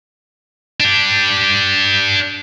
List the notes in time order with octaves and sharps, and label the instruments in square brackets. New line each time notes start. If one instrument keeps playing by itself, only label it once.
[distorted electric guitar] D4 G4